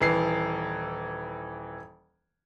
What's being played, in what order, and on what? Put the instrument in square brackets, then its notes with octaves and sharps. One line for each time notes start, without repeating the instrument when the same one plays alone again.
[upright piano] D#1 E3 C7